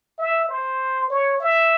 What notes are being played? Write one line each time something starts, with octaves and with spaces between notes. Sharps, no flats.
E5
C5
C#5
E5